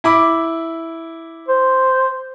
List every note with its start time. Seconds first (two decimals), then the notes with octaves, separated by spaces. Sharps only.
0.04 E4 B5 D6
1.48 C5